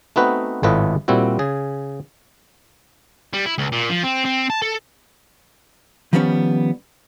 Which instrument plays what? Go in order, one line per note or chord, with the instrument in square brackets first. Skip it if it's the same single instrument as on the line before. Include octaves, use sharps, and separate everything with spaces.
[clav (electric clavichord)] A3 B3 C4 D#4 F#4 B4
G#1 A2 A3 F4 B4 D#5
A#2 G3 C4 E4 F#4
C#3 G#4
[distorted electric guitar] G3
E4
C#2
A#2
F3
C4
C4
A5
A4
[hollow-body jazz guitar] D#3 F3 G3 A#3 B3 C#4